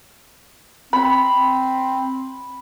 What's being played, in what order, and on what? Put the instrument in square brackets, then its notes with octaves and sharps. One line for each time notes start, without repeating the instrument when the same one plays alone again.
[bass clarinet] C4 [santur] B5